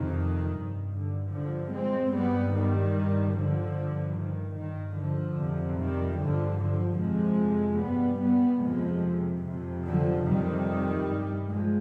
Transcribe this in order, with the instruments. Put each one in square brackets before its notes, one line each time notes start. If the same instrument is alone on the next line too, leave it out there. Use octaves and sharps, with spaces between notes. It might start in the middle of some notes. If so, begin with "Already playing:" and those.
Already playing: [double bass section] F2 C3 D#3
G2
D3
G2 D3 F3
G#3 C4
G2 G3 B3
D#3 G3
G2
D3 F3
G2
D#3
G2 D#3
D3 F3
F2 C3
D#3 G3
G2 D3 F3
D3 F3
F2 C3 F3 G#3
G2 G3 B3
G3 B3
F2 C3 F3 G#3
F2 C3
D3 F3
F2 C3 D#3 G3
G2
F3 G#3